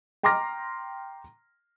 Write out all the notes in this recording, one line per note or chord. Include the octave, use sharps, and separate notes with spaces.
G5 A#5 C6 D6 F6 A#6